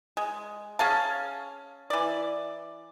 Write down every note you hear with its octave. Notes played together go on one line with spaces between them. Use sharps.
G#3
C#4 G#4 F5 A5
E3 D5